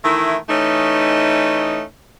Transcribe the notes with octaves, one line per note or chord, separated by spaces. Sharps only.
D#3 E3 A3 E4
E3 A3 C#4 D#4